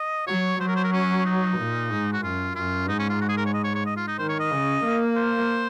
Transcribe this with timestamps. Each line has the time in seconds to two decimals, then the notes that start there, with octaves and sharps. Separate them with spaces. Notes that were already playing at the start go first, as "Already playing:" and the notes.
Already playing: D#5
0.27 F#3 C#5
0.60 F#3 C5
0.68 A#4
0.76 C5
0.84 A#4
0.93 C#4
1.25 D#4
1.57 A#2
1.90 G#2
2.13 F#4
2.23 F#2 F4
2.56 F#2 F4
2.88 G#2 D#4
2.99 C#4
3.10 F4
3.21 F#4
3.29 G#4
3.37 A#4
3.46 C#5
3.54 D#5
3.64 C#5
3.75 C#5
3.86 D#5
3.97 F4
4.08 D#4
4.18 D#3 C5
4.29 C#5
4.40 D#5
4.51 C#3
4.83 A#3
5.17 C5